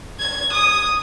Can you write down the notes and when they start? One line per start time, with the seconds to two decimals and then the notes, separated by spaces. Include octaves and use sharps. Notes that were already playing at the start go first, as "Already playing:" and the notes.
0.19 G#6
0.52 D#6